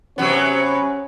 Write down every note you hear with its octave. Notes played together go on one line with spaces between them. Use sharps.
C3 F#3 B3 C#4 C#5